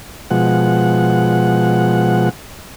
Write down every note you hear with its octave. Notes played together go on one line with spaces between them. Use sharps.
B2 F3 G#3 F#5